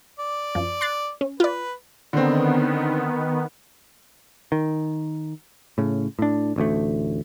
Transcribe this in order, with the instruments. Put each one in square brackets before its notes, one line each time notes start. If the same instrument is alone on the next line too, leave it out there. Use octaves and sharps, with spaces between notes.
[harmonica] D5
[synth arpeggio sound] F#2 F3
C6 F#6 A6
C#4
[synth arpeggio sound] F4 D5 [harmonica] B4
[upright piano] D3 C4 [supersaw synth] D#3 B3
[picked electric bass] D#3
A2 C#3
A2 D4
A1 D2 A3